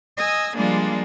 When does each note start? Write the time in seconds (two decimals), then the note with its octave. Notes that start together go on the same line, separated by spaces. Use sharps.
0.17 D#5 G#5 D#6 E6
0.57 F3 G3 G#3 A#3 D4 F4